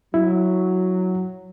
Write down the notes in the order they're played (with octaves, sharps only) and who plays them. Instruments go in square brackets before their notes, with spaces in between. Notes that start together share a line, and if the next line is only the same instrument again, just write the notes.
[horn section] F#3 [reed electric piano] E4